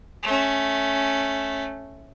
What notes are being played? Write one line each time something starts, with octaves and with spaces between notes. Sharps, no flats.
A3 C#4